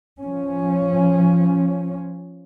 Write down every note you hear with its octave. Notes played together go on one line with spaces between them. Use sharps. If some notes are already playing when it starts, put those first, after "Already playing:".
F3 C#4